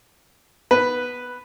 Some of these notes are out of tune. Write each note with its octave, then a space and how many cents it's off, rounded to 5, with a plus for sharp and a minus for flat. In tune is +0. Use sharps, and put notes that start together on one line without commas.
B3 +0 B4 +0